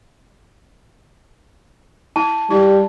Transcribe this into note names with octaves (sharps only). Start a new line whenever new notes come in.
E4 A5
G3 E4